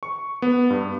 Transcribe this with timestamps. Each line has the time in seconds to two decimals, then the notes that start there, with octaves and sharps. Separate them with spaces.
0.03 C#6
0.42 B3
0.70 G2